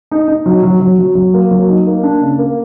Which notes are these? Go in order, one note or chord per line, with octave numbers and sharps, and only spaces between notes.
D#4
D#4
F#3
F#3
F#3
F#3
F#3
A#3
F#3
D#4
A#3
D4
C#3
A#3